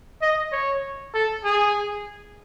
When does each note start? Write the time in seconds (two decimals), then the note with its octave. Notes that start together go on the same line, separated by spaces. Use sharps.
0.22 D#5
0.52 C#5
1.14 A4
1.44 G#4